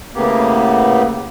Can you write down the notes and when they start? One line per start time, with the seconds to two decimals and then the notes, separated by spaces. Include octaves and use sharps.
0.15 A2 C#3 A#3 B3 G4